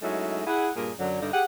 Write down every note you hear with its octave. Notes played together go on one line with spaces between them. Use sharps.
F#3 G#3 A3 C#4 D#4 E4
E4 G#4 F#5
G2 A#2 G#4 A#4
F#2 D3 F#3
G2 D3 D#4
G4 G#4 F#5